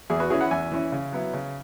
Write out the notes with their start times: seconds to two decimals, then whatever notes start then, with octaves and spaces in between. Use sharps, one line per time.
0.10 E2 E4 G#4
0.20 F#4 B4
0.30 E3 C#4 E4 G#4
0.41 F#5 B5
0.51 E2 E5 G#5
0.72 E3 C#4 E4
0.92 C#3
1.13 F#3 B3 E4
1.33 C#3